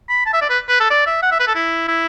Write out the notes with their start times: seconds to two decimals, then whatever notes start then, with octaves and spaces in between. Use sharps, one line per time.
0.09 B5
0.26 A5
0.34 E5
0.42 D5
0.50 B4
0.69 B4
0.80 A4
0.90 D5
1.07 E5
1.23 F#5
1.31 E5
1.40 B4
1.47 A4
1.55 E4
1.88 E4